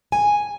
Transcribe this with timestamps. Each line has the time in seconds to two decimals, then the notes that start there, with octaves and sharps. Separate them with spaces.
0.12 G#5